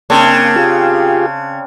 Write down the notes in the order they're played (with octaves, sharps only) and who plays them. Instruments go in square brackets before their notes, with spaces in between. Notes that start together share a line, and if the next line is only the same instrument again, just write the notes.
[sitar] C#3 [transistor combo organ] A#3 [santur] C4 D4
[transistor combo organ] F4 G4 G#4